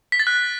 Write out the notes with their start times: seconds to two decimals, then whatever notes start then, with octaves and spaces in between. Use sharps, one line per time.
0.12 B6
0.20 A6
0.27 F#6